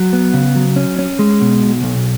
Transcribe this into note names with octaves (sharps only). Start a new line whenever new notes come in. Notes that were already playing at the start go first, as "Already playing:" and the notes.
Already playing: F#3
B3
C#3
F#3
C#4
C#4
G#3
B2
B1
B1